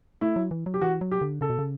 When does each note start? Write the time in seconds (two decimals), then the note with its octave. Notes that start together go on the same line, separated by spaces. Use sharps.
0.21 A3 E4
0.36 F#3
0.51 E3
0.66 F#3
0.74 G4
0.81 E3 F#4
1.01 F#3
1.11 G4
1.21 D3
1.41 C#3 A4
1.50 B2
1.59 C#3